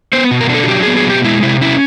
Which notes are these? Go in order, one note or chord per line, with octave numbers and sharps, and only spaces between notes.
B3 C5
B2
A#4
D4 A4
F#4
F#3 G4
B3 G#4
G#4
B2 G4
G#3 E4
C3 E4
C#4 E4